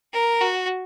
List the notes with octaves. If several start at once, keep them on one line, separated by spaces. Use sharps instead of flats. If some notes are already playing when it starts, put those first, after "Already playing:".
A#4
F#4